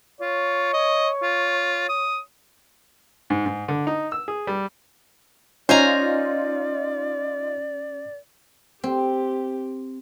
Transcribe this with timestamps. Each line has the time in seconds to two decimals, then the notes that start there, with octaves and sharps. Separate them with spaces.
0.21 F4 C#5
0.74 D#5
1.22 F4
1.89 D#6
3.30 G#2
3.46 G#2
3.68 D3
3.87 D#4
4.12 E6
4.28 G#4
4.47 G3
5.69 C#4 D#4 F4 C5 D5 G#5 A#5
8.84 C4 G4